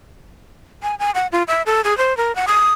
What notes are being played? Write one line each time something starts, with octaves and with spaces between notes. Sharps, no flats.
G#5
G#5
F#5
F4
E5
A4
G#4
C5
A#4
F#5
D#6